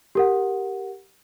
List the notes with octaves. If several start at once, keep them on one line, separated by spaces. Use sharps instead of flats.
G4 A#4 F#5